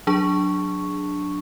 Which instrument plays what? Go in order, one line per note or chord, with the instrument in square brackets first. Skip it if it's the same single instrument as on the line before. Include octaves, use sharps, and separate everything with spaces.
[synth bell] F#3 D4 G#4 A5 C#6